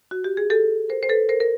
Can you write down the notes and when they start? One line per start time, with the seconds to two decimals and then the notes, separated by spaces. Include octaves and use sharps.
0.11 F#4
0.24 G4
0.37 G#4
0.50 G4 A4
0.89 A#4 C5
1.03 C5
1.09 A4 B4
1.29 A#4 C5
1.40 A#4